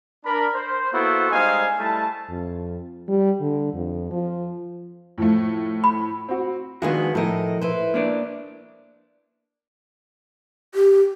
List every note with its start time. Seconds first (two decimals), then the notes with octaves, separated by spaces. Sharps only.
0.24 D4 A#4 B5
0.54 C5
0.92 A#3 B3 E4 F#4 A4 C5
1.31 G3 G#3 D#4 C5 F5 G#5
1.79 G3 A3 E4 A5
2.30 F2
3.08 G3
3.41 D3
3.74 F2
4.11 F3
5.18 A2 F3 A3
5.84 B5
6.29 C4 F#4
6.82 D#3 F3 G#3 B3 D4 F#4
7.15 A2 F3 A4 A#4 D#5
7.61 E4 B4 C5
7.94 A#3 D4 D5
10.75 G4